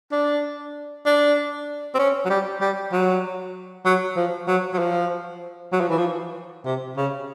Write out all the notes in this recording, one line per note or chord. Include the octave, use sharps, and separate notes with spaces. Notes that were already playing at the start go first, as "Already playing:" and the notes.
D4
D4
C4
C#4
F#3
G3
G3
F#3
F#3
F3
F#3
F#3
F3
F#3
F3
E3
F3
C3
C#3